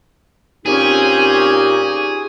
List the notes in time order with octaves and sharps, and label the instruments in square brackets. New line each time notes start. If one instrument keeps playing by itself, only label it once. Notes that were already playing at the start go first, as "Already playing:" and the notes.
[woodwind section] A#2 D#4 G4 [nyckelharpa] C4 C#4 [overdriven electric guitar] G#4